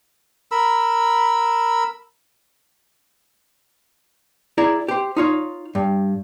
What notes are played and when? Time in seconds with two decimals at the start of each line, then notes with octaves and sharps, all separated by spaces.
0.51 A#4 B5 E6
4.58 E4 G#4 D5 A#5
4.88 G4 C5
5.17 D#4 F4 C#5
5.75 G2